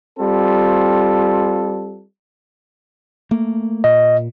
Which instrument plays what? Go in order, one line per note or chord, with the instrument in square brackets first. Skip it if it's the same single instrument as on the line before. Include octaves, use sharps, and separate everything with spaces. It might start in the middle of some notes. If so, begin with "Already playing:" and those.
[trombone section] G3 C4 F4 A4
[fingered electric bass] A3 A#3
[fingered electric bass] A#2 [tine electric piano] D#5